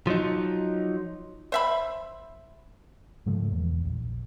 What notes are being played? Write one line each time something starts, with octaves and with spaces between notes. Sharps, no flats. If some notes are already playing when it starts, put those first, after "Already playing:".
F3 F#3 D#4
C5 E5 B5
G#2 C#3 F3 A3
E1 E2
A#1